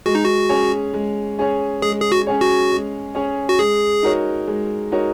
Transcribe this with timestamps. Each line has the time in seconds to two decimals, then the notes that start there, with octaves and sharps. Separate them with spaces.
0.06 G#3 F#4
0.15 D#4
0.24 F#4
0.49 C#4 G#4 C#5
0.94 G#3
1.39 C#4 G#4 C#5
1.82 G#3 G#4
2.02 G#4
2.12 F#4
2.27 C#4 G#4 C#5
2.41 F#4
2.71 G#3
3.15 C#4 G#4 C#5
3.49 F#4
3.59 G#3 G#4
4.03 D#4 F#4 A#4 C#5
4.48 G#3
4.92 D#4 F#4 A#4 C#5